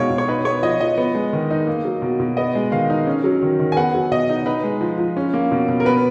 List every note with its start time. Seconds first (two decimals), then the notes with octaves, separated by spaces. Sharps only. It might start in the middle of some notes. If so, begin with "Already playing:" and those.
Already playing: B2 G#3 D#4 C#5 F5
0.10 B2
0.18 C#5
0.28 D#4 B4
0.45 B3 C#5
0.63 F3 D#5
0.80 F3 D#5
0.98 B3
1.15 G#3
1.33 D#3
1.51 D#4
1.67 A#3
1.85 F#3
2.02 B2
2.20 B2
2.37 B3 D#5
2.55 G#3
2.72 D#3 F5
2.90 D#4
3.07 C#4
3.24 F#3
3.42 D#3
3.59 D#3
3.72 G#5
3.76 B3 F#5
3.95 F#3
4.11 B2 D#5
4.29 D#4
4.46 D#4 B4
4.64 G#3
4.81 F3
4.98 F3
5.17 C#4
5.34 A#3
5.51 B2
5.68 B2
5.80 A#4
5.85 B3 B4